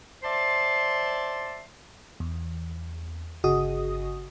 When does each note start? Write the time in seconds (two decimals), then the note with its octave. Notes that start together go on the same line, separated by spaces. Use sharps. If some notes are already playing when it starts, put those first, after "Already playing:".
0.23 C5 D5 E5 A5 C6
2.20 E2
3.44 G1 C#3 F#4 G#4 D#5 D#6